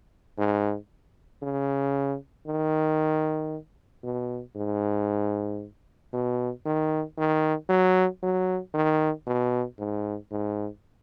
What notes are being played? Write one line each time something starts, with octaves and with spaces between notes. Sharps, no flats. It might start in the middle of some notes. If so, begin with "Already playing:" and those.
G#2
C#3
D#3
B2
G#2
B2
D#3
D#3
F#3
F#3
D#3
B2
G#2
G#2